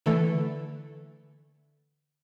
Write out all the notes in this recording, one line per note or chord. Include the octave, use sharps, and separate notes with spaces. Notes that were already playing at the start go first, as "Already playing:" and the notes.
D3 E3 A3 A4